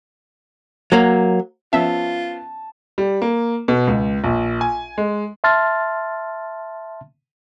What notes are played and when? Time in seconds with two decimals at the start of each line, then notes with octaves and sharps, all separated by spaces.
0.92 F#3 A#3
1.73 F3 B3 C#4 F4 E5 A5
2.98 G3
3.22 A#3
3.68 B2
3.87 C#2
4.24 A#1
4.61 G#5
4.98 G#3
5.44 E5 A5 C6 F6 A6